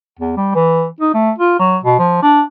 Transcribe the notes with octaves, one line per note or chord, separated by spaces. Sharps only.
E2
G3
E3
D#4
A3
F4
F#3
B2
F3
D4